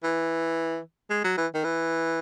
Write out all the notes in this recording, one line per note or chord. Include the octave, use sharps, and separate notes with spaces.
E3
G#3
F#3
E3
D#3
E3